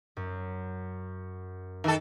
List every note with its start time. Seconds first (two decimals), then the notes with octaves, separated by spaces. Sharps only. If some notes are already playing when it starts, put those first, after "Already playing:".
0.17 F#2
1.84 D#3 A4